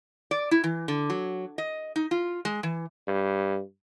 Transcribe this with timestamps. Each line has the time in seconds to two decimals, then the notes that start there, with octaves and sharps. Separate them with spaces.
0.31 D5
0.51 E4
0.64 E3
0.88 D3
1.10 F#3
1.58 D#5
1.96 D#4
2.11 F4
2.45 G#3
2.63 E3
3.07 G2